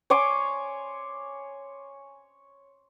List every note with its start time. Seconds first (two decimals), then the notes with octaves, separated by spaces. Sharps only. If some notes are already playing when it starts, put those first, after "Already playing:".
0.10 C#5 G#5 C6 D6